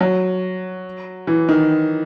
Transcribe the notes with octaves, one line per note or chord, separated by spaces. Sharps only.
F#3
E3
D#3